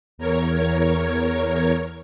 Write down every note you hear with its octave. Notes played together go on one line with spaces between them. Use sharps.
E2 A#4 C#5 G#6